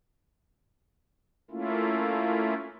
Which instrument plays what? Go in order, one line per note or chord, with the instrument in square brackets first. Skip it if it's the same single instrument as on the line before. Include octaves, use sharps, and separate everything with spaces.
[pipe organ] A3 A#3 C#4 E4 F4